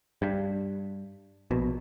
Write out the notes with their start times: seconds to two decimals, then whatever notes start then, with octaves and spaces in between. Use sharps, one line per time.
0.22 G2
1.51 A#1 B2